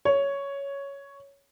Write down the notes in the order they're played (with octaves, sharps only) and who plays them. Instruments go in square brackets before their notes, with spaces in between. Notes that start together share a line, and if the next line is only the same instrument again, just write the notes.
[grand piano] C#5